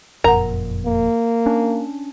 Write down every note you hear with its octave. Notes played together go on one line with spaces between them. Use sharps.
F#1 F2 A#2 A#4 F#5 A#5
A#3
C#4 D4